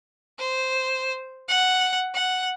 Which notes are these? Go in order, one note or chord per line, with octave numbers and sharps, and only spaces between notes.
C5
F#5
F#5